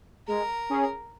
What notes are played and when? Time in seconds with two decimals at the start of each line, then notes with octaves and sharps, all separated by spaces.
0.27 G#3 A#4
0.70 C#4 G#4